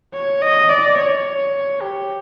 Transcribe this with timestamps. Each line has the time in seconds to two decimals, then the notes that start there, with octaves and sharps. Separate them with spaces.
0.13 C#5
0.41 D#5
0.69 D5
0.97 C#5
1.81 G4